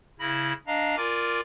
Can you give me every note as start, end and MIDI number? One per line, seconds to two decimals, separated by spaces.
0.19 0.53 49
0.19 0.53 64
0.19 0.53 83
0.19 0.53 94
0.67 0.96 62
0.67 0.96 75
0.67 0.96 77
0.67 0.96 82
0.97 1.41 65
0.97 1.41 70
0.97 1.41 74
0.97 1.41 80
0.97 1.41 86